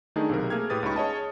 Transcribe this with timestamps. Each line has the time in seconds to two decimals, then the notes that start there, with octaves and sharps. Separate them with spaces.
0.16 D#3 A3 D4 D#4 G#4
0.29 B1 C3 A#4
0.50 A3 A#3 G#4 F6 G#6
0.70 A2 G4 B4 D#6 A6
0.83 C#2 C#4 D#4 B5 C#6
0.96 G#4 C#5 D#5 A5